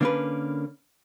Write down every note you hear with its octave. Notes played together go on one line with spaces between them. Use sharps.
D3 A#3 C#4 A#4 B4